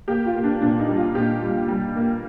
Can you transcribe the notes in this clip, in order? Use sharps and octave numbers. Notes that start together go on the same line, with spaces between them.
A#3 G4
F4
A#3
D4
A#2 D4
D#4
G3
F4
A#2 G4
G3
G3
A#3